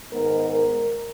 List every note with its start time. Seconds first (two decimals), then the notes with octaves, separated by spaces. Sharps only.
0.11 G#2 D#3 G#3 B3 A#4
0.51 A#4